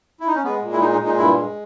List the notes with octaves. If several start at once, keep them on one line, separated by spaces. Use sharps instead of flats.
E4
D#4
C#4
G#3 B3
A#2
E4
G#3 D#4
D#4
A#2
D#4
G2 E4
G#3